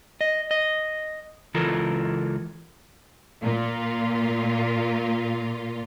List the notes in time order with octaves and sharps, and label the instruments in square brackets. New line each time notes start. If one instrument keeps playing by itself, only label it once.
[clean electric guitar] D#5
D#5
C#2 E3 F4 A4 A#4
[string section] A#2 F4